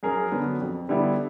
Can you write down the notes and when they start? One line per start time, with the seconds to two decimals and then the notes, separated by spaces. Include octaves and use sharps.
0.03 F#2 G#4 A#4
0.32 D3 F#3 B3
0.61 F2
0.89 D3 G3 B3 E4